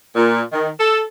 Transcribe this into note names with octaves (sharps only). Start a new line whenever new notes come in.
A#2
D#3
A4